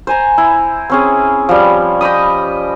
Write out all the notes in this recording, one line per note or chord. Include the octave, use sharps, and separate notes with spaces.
C5 G#5 A#5
E4
C4 C#4 G#4
F3 G3
D#5 G5 B5 D#6